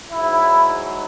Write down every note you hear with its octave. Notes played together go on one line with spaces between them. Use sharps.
G#2 F#3 E4